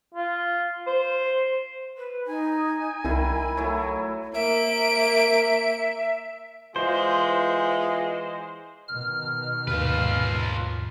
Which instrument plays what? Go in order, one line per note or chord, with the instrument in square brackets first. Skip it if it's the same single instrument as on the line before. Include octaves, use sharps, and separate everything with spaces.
[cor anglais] F4
C5
[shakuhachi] B4
[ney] D#4 [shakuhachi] G#5
[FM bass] C2 [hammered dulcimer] D#3 E4 [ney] B5
[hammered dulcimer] F#3 A3 E4
[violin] A#3 D7 [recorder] E5
[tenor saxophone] E3 [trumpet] G#3 [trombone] F4 [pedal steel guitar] C5
[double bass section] B2 D#3 [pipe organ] F6
[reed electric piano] D#2 G#2 [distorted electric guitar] F4 B4